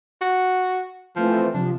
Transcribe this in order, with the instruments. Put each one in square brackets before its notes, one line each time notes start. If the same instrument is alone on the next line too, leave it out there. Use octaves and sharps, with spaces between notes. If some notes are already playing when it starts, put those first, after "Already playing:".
[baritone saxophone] F#4
[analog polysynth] E3 A3 C4 [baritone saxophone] F3
[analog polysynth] C3 F3 [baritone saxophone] D4